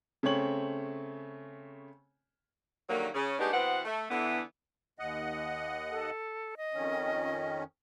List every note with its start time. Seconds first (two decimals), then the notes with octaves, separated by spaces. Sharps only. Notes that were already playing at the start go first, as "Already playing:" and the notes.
0.23 C#3 A3 C4 C#5 F#7
2.90 D3 D#3 F#3 G3 A#3
3.14 C#3 C#4
3.39 G#3 A3 B3 D4 D#4 G4
3.53 B2 E3 B3 C4 F#5
3.85 A3
4.10 D3 E3 B3
4.99 D#2 D#5 F#5
5.91 A4
6.57 D#5
6.74 F2 D#3 C#4